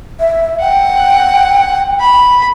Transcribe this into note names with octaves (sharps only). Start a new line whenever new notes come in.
E5
F#5 G5
B5